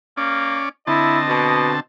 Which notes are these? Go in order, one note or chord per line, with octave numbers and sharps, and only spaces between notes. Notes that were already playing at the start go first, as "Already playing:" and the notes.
A#3 C#4 D5
D3 C4 E4 D#5 A5
B2